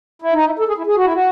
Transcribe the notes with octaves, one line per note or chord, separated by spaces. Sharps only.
E4
D#4
E4
A4
G#4
E4
G#4
F#4
E4
F#4